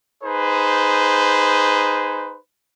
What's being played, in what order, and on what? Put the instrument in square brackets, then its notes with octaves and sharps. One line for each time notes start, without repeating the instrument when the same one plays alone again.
[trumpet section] D#4 G#4 B4 C5